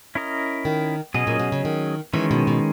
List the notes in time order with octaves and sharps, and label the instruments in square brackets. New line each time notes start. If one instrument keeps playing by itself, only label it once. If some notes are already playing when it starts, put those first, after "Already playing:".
[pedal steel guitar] C#4 E4 A#4 D#5
[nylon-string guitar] D#3
[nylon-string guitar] B2 [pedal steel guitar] F#3 C#4 G#4 D#5
[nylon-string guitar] A#2
B2
C#3
D#3
[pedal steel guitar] D#3 G#3 C#4 [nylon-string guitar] E3
[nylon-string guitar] B2
B2